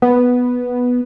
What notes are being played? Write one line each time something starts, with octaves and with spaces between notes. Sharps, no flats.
B3